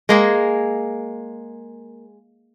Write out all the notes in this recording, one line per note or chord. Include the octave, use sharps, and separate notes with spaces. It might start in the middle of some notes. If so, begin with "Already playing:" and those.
G#3 A#3 G#4